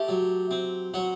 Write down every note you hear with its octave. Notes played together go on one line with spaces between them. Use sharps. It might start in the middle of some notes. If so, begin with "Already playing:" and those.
Already playing: A3 G4
F#3
C4
F#3 F#4